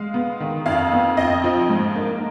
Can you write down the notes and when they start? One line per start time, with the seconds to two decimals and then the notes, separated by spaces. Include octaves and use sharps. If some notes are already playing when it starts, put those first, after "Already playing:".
Already playing: G#3 F5
0.14 B3
0.40 D#3
0.66 F2 F5
0.92 B3
1.17 F2 D#5
1.44 F3
1.69 G#2
1.95 A#3